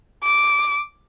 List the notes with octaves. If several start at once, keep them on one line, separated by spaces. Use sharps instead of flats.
D6